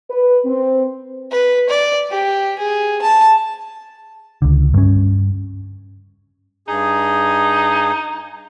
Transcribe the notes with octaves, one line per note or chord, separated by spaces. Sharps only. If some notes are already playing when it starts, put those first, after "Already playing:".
B4
C4
B4
D5
G4
G#4
A5
C#2 D3
G2 C#4
G2 D#4 G#4